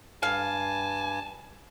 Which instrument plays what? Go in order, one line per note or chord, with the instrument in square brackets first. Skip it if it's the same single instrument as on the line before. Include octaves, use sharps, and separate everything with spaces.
[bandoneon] G2 G#5 [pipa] F5 [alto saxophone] A5